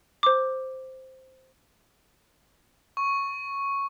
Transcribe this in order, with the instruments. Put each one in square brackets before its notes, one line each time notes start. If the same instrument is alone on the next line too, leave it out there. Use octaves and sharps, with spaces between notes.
[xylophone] C5 D6
[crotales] C#6